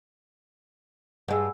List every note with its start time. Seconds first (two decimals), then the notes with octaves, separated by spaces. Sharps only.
1.28 G2 G#3 F#5 G#5 E6